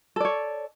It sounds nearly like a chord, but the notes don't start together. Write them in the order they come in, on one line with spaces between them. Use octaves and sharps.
A4 D5 C#5